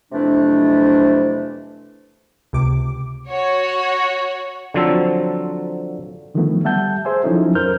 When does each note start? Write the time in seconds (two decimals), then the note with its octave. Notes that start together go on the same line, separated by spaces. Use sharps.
0.12 F2 C3 E3 F#3 A3 D4
2.53 C#2 C3 D6
3.27 F#4 C#5
4.74 D3 F3 F#3 C4 A4
6.34 D3 D#3 F3 F#3 A3 B3
6.64 G3 E5 F#5 A5 G6
7.05 G#4 C5 E5 G#5
7.23 F3 F#3 C#4 D#4 E4 A4
7.55 F2 A#4 C5 F6 G6